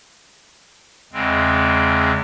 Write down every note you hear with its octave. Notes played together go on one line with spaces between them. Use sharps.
E2 C#3 G#3 C4